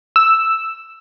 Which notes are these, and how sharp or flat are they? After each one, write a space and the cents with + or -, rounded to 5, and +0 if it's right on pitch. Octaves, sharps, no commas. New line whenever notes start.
E6 +0